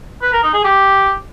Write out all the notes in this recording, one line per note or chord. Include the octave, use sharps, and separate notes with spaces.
B4
A#4
D#4
G#4
G4